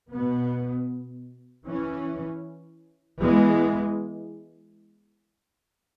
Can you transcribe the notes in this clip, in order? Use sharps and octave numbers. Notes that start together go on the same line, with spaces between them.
B2 B3
E3 C#4
E3 G#3 B3